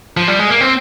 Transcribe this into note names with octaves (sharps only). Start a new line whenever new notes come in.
F3
G3
G#3
A#3
C4